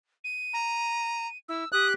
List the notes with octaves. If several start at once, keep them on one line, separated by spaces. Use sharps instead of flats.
D#7
A#5
E4 E6
G4 D#6 F#6